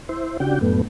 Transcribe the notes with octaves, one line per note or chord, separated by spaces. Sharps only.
E4 C5
C#3 D4 F#4 G4 G5
F#2 A2 A3 B3